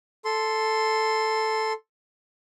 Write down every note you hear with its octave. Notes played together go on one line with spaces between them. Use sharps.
A4 C6